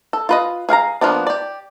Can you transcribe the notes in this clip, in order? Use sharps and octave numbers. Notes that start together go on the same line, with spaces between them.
A4
F4 B4 D#5
G#4 F5 G5 A#5
F3 A#3 B3 D4
G4 D5